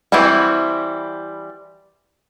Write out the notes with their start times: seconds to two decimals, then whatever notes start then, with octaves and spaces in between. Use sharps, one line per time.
0.12 E3 G3 C4 E4 F#4